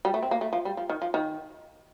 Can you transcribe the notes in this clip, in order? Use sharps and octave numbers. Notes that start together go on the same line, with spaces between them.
G3
A3
C4
A#3
A3
F3
G3
F3
D#3
F3
D#3